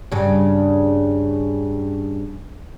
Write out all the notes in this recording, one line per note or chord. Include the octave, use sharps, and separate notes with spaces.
G2 C#3